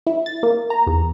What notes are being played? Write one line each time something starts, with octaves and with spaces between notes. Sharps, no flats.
E4
A6
A#3
A#5
E2